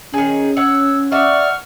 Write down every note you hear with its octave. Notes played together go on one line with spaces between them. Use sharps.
D#3 C#4 G#4
C#5 F#5 E6
D5 E5 F#5 C#6 F6